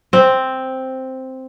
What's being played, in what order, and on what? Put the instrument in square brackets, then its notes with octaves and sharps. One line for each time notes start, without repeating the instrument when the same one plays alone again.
[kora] C4